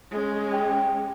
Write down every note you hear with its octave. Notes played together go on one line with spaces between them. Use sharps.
G#3 C#4
G4